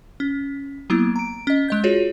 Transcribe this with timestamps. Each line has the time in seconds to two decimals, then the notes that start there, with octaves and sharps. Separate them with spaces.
0.20 C#4
0.90 F#3 A#3 B3 E4
1.16 A#5 D7
1.47 C#4 D#5
1.68 G#3 D#5 G6
1.84 F4 F#4 G#4 C#5